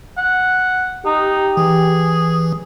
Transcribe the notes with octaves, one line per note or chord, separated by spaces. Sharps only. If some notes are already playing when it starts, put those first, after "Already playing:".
F#5
D#4 G4
E3 G#4